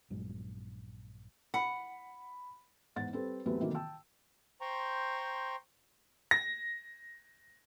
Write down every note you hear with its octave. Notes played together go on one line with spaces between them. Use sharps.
A#1 G2 F#3 G#3
F#5 B5
E2 G#2 F#5 A6
G3 C4 A4 B4
E2 F#3 A3 C4 G4 B4
C3 D#3 E3 F#3 A3 A#3
G5 A5 E6
C5 G5 A#5 C6 C#6
A#6